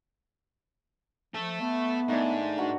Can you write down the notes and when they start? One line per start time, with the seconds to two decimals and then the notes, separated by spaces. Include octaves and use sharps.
1.34 F3 A4 E5
1.61 A3 B3
2.08 G#2 D#3 A3 D4
2.58 D4 F#4 A#4